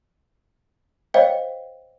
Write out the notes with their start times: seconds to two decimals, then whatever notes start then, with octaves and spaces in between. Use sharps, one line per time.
1.14 C5 C#5 D#5 F5 G5